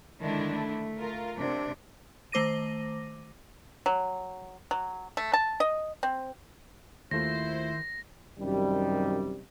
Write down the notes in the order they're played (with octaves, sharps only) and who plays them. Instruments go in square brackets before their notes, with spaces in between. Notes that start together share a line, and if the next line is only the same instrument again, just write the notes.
[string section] D3 D4 E4 [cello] D#3 G#3
[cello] A3
[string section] F4 A#4
[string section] C3 [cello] D4
[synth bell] D#3 A3 C5 D6 A#6 D#7
[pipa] F#3
F#3
A3
A5
D#5
C4
[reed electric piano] D#2 A3 F4 [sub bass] D#3 [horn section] E4 C5 [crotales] A#6
[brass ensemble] F#2 C3 D#3 G3